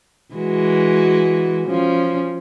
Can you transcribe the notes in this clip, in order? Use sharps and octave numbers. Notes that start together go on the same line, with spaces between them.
E3 G#3 F#4
F3 C#4